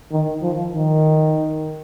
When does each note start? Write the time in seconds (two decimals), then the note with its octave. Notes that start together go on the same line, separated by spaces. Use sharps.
0.12 D#3
0.42 F3
0.73 D#3